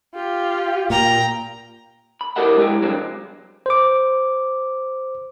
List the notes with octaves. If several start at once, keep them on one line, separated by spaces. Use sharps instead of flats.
F4 G4
A#2 G5 A#5
B5
E4 G4 A#4 D#5 E5 F#5
G#3 E4 G4
G2 C#3 F#3 G#3 C4
C5 D6